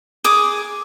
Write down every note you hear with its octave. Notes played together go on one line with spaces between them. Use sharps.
G#4 D6 D#6